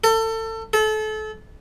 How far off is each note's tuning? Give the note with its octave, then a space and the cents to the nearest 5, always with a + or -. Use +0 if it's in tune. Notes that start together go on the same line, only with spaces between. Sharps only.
A4 +30
A4 -30